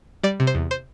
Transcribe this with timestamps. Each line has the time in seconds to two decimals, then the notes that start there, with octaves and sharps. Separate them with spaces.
0.23 G3 D5
0.40 C3
0.47 C5
0.55 E2
0.71 C5